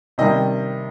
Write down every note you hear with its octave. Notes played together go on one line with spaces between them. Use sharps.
C3 D#3 G3 D#5